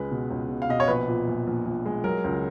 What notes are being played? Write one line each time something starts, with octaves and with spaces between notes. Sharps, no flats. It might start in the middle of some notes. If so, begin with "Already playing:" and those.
Already playing: C#2 G#3 B4
B2
C#2
B2
F5
B2 D#5
C#5
A#1 B4
A#2
A#1
A#1
A#1
G#3
F#3 A#4
C#2